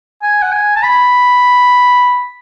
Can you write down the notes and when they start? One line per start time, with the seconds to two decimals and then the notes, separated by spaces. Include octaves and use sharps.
0.22 G#5
0.42 F#5
0.52 G#5
0.75 A5
0.83 B5